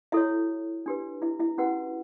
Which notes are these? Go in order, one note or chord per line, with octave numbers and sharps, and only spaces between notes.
E4 F#4 A4 C#5 E5
D4 G4 B4
E4 E5
E4 E5
C#4 F#4 G4 B4 F#5